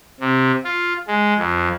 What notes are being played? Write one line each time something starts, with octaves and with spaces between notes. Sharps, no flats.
C3
F4
G#3
F2